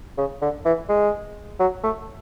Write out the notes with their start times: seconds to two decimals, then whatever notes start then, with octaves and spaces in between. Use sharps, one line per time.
0.18 C#3
0.42 D3
0.65 E3
0.89 G#3
1.60 F#3
1.83 A3